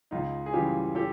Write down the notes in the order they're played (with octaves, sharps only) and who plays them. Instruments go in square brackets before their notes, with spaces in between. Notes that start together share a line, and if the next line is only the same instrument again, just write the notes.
[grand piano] C#2 D#4 F4
G#4
C#3 E3 G3 F4 G4
G4 A4